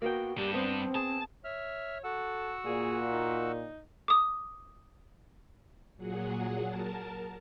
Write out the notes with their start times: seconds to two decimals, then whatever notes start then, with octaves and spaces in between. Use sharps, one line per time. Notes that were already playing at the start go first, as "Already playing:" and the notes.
0.02 A#3 B3 F#4 G5
0.37 G2 D4 G4
0.54 B3 C4 C5
0.95 G#4 A5
1.45 C#5 E5 F6
2.04 F#4 A4 F#5 E6
2.66 A#2 G#4
3.10 D#4
4.08 D6 D#6
5.97 A#2 F#3 G#4 F#5
6.63 A#4 A5